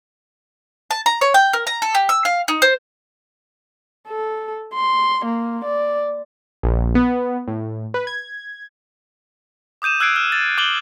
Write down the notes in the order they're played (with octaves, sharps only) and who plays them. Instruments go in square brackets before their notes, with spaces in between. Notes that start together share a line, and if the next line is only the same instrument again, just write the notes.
[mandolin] A5
A#5
C#5
G5
A#4
A#5
A4
G4
E6
F5
D#4
C5
[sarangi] A4
C6
A#3
D5
[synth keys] A#1
B3
A2
B4
G#6
[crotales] D6 D#6 G6 D#7 E7
E6 F#6 G#6 C7 D7
F6
A6
D6 F#6 G6 F#7 G7